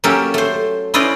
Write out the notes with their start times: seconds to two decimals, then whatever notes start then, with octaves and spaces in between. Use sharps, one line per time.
0.04 F#3 A#3 C#4 G4 A4 E5
0.34 A3 C5
0.94 C#4 E4 B4 C5 D5 D#5